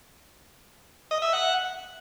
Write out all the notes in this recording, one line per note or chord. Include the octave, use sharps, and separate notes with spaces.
D#5
E5
F#5